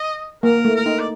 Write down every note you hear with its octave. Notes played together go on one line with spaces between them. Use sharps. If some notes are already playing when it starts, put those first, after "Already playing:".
Already playing: D#5
A#3 A#4
A3
A#4
D#4
D5